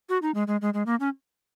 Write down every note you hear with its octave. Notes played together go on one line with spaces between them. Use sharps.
F#4
D#4
G#3
G#3
G#3
G#3
A#3
C#4